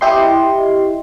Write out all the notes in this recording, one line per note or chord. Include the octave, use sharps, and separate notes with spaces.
E4 G4 D#5 C6